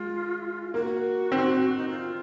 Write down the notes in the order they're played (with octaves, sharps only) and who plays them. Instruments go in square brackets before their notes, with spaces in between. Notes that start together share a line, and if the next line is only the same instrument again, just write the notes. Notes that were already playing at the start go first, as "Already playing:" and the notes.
Already playing: [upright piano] G#3 [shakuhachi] F4
[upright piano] A#3 [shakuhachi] F#4
[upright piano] C4
[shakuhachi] D#4
F4